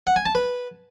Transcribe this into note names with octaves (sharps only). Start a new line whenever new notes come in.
F#5
G#5
A5
B4